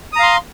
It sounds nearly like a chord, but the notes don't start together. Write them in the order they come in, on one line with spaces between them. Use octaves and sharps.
D#6 A#5 F5 C6